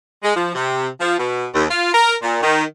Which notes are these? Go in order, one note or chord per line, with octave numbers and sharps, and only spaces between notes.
G#3
F3
C3
F3
B2
D#2
F4
A#4
A#2
D#3